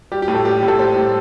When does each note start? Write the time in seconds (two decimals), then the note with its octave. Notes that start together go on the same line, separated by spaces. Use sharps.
0.12 G3 G4
0.22 G4
0.28 A2
0.35 A4
0.45 G3 G4
0.63 A2
0.68 A4
0.78 G3 C5
0.96 A2